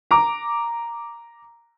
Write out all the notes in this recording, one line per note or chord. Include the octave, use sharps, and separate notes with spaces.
A#5 D6